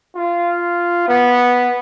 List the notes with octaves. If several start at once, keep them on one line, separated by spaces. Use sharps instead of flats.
F4
B3